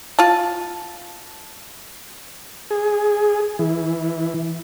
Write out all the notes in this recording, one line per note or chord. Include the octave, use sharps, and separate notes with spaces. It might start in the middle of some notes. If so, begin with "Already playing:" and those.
F4 A5
G#4
E3